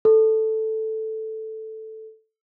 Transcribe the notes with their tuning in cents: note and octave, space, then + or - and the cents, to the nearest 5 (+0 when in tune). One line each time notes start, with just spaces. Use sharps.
A4 +0